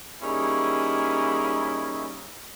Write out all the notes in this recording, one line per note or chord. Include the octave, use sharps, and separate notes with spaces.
G3 A#3 C#4 D#4 E4 G#4